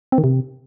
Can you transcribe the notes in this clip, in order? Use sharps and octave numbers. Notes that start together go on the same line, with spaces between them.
C4
D#3
C3